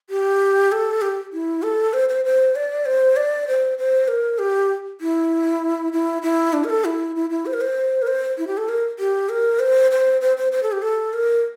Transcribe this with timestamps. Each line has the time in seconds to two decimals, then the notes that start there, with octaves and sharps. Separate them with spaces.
0.10 G4
0.72 A4
1.02 G4
1.33 E4
1.63 A4
1.93 C5
2.09 C5
2.25 C5
2.56 D5
2.86 C5
3.16 D5
3.48 C5
3.78 C5
4.08 A#4
4.39 G4
5.01 E4
5.93 E4
6.22 E4
6.53 D4
6.64 A#4
6.70 A4
6.85 E4
7.16 E4
7.30 E4
7.46 C5
7.54 A#4
7.61 C5
8.02 A#4
8.07 C5
8.38 E4
8.47 G4
8.57 A4
8.69 A#4
8.99 G4
9.29 A#4
9.60 C5
9.91 C5
10.21 C5
10.37 C5
10.52 C5
10.63 A4
10.72 G4
10.82 A4
11.13 A#4